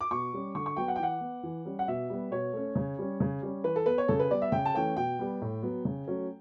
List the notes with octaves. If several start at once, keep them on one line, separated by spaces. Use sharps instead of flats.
D6
B2 C#6
G3 C#4
D3 C#6
C#6
F#3 B3 G5
F#5
G5
E3 F#5
B3
E3
G3 C#4
F#5
B2 E5
G3 B3
B2 C#5
A3 C#4
C#3
G3 C#4
C#3
G3 C#4
E3 B4
A4
B3 B4
C#5
C#3 A4
B4
G3 B3 D5
E5
C#3 G5
A5
E3 A3 C#4 G5
B2 G5
G3 B3
A2
F#3 B3
C#3
F#3 A3 C#4